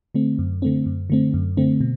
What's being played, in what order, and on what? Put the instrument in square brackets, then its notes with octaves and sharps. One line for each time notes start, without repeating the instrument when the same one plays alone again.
[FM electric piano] D3 A3 C4
F#2
D3 A3 C4
F#2
D3 A3 C4
F#2
D3 A3 C4
B2